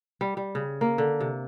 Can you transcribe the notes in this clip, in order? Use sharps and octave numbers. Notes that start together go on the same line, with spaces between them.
G3
G3
C#3
A#3
D3
C3